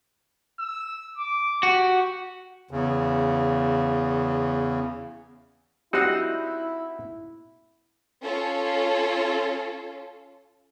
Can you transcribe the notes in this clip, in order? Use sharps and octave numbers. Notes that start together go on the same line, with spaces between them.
E6
D6
F#4 G4
E2 C#3
G3 C4 D#4 E4 F#4 F#5
C#4 F4 A4